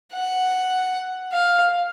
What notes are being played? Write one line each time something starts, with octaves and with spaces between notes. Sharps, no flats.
F#5
F5